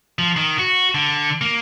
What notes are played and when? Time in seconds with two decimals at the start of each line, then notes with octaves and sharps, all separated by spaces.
0.19 F3
0.37 D#3
0.58 F#4
0.95 D3
1.41 A#3